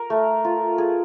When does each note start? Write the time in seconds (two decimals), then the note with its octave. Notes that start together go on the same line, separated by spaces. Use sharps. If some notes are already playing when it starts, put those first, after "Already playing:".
Already playing: A#4
0.10 A3
0.45 F4
0.78 G#4